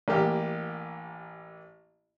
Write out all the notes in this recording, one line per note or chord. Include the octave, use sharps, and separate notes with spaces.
A1 A#3 G4 F6